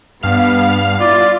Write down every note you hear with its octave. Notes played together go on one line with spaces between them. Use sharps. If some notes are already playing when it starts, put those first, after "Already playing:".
G2 B3 F5 F6
E4 F4 D5